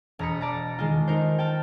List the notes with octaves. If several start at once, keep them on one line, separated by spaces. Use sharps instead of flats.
E1 A#5 B5 D#6 C#7
D5 A5 A#5
D#3 G#3 F4
D#4 A#4 C5
G5 A5 F6